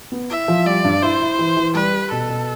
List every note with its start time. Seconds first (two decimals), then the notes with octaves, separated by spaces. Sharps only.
0.12 B3
0.30 E4 E5
0.48 F3
0.66 G3 D5
0.84 G2
1.02 E4 C5
1.21 E4
1.39 E3
1.57 E3
1.75 G3 B4
1.93 G4
2.11 B2 A4
2.29 B2